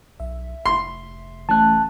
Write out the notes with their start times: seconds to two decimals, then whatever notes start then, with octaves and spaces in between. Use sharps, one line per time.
0.20 B1 E5
0.66 F1 C6
1.49 E3 A3 C#4 A5 F#6